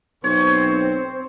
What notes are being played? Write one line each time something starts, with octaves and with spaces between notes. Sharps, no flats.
B1 C4 C5 C#5